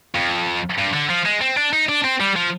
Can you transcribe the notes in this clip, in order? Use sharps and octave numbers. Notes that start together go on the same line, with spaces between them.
F2
G2
D3
F3
G#3
C4
D4
D#4
D4
C4
G3
F3